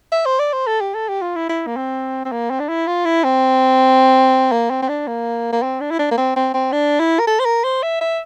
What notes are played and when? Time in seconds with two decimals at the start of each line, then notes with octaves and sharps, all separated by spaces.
0.12 E5
0.26 C5
0.39 D5
0.53 C5
0.67 A4
0.81 G4
0.95 A4
1.08 G4
1.22 F4
1.35 E4
1.49 E4
1.67 A#3
1.77 C4
2.25 C4
2.32 A#3
2.50 C4
2.60 D4
2.68 E4
2.87 F4
3.05 E4
3.24 C4
4.52 A#3
4.70 C4
4.82 C4
4.88 D4
5.07 A#3
5.52 A#3
5.62 C4
5.80 D4
5.91 E4
5.99 D4
6.11 A#3
6.17 C4
6.36 C4
6.54 C4
6.72 D4
7.00 E4
7.19 A#4
7.27 A4
7.39 C5
7.45 A#4
7.64 C5
7.82 E5
8.01 E5